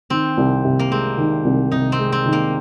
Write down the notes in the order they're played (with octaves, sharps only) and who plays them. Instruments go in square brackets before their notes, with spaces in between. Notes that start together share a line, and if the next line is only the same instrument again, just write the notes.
[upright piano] D#3 [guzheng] C4
[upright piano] C2
C3
[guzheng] A#3
[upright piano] G#3 [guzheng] C4
[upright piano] D#3
C2
[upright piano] C3 [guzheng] D#4
[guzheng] C4
[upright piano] G#3
[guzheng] C4
[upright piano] D#3
[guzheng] A#3